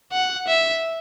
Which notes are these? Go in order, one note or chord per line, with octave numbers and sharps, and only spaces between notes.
F#5
E5